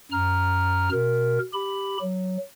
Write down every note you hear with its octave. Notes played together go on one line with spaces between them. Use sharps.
F#2 A#5 F6
B2 A#4
G4 B5
F#3